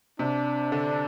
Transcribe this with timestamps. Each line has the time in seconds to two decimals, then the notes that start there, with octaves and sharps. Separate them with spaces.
0.19 C3 D4
0.72 D3